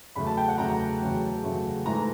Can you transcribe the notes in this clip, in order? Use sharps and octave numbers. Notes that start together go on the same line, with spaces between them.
E2 C#3 F#3 A3 B5
A5
G5
F#5
E2 C#3 F#3 A3 A#5
E2 C#3 F#3 A3
E2 C#3 F#3 A3
G#2 E3 A3 A#5